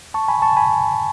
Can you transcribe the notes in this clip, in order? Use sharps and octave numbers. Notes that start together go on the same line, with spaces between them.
A5 C#6
G#5 B5
A5 C#6
G#5 B5